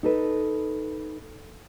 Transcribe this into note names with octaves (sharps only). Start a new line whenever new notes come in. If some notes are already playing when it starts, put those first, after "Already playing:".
D#4 A4 B4